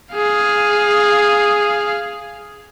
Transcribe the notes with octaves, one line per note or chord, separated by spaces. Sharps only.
G#4 F5